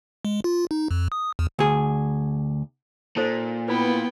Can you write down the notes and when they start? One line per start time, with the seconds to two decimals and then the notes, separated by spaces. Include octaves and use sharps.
0.25 G#3
0.44 F4
0.71 D#4
0.91 F2
1.12 D#6
1.39 E2
1.59 D2 G#4
3.17 A#2 D#4 A4 C5
3.68 B3 E4 B4 G5 B5